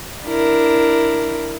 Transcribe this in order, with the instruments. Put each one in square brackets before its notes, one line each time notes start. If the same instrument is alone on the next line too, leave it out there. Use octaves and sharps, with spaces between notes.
[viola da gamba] D4 E4 A#4